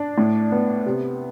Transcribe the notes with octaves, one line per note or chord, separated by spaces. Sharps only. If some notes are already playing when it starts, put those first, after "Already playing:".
Already playing: D4
A2
B3
C3